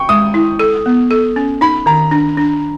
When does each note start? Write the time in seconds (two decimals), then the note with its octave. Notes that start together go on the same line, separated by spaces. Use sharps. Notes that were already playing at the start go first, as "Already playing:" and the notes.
Already playing: G5 C#6
0.09 G#3 D#6
0.34 E4
0.59 A4
0.86 B3
1.11 A4
1.36 C#4
1.61 D#4 B5
1.86 D#3 A#5
2.11 D4
2.37 D4